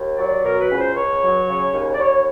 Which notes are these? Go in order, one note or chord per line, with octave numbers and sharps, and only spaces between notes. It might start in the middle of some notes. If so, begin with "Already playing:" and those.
Already playing: D#2
F#3 D5
B2 A#4
B4
C#2
C5
C#2 C#5
F#3
C#3
D#2
D5
D#2 C#5